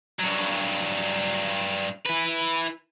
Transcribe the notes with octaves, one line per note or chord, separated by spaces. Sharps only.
G2 F#3
E4 B4